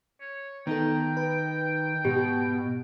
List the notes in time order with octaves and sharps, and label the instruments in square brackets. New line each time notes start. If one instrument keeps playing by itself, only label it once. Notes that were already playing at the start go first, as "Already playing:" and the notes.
[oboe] C#5
[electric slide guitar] D#3 [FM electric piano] B3 D#4 A4 [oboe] G5
[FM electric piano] B4
[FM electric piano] G#2 [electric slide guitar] B2 [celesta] G4